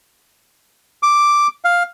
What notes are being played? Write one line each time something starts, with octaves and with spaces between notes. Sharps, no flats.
D6
F5